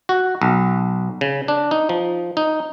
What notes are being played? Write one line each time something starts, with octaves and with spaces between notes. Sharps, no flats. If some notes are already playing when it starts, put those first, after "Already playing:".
F#4
B1
C#3
D4
D#4
F3
D#4